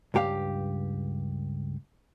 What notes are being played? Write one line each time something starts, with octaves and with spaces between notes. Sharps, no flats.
C#2 G2 G4 F5